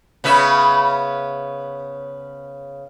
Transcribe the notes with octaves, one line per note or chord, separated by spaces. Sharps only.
C#3 B3 E5